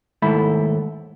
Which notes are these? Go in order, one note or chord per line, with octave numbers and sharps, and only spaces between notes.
D#2 G#2 A3 E4 B5